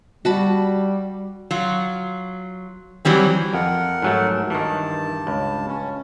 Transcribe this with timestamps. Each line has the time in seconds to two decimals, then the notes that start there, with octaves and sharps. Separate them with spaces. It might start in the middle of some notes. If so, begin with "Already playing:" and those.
0.25 G3 F#4 A5 B5
1.51 F#3 F4
3.05 E3 F#3 G3 C4
3.54 F2 A#4 F#5
4.02 G#2 F#3 A3
4.50 G2 D#3 E3 A5
5.27 C#2
5.68 C#4